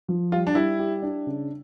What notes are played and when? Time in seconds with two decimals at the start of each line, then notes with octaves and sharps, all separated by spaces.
0.08 F3
0.32 G3 F4
0.47 D4
0.55 G3 E4
0.79 G4
1.02 D4
1.26 C#3